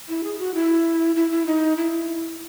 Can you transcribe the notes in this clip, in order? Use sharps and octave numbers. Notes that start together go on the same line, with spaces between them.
E4
G#4
F#4
E4
E4
E4
D#4
E4